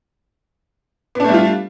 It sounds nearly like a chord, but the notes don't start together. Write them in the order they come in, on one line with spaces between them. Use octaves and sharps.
B3 D4 A3 G3 F4